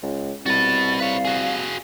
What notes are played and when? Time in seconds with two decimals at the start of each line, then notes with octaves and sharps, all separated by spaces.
0.02 C#2
0.46 C2 F#4 B4 A6
1.00 B4 C#5 F5
1.25 F#4 G#4